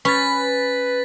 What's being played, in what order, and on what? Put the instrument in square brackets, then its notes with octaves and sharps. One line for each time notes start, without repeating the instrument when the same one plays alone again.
[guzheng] C#4 [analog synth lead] B4 [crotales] A6 B6